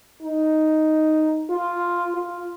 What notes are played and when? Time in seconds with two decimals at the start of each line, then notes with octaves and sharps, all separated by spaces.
0.22 D#4
1.50 F4
2.15 F4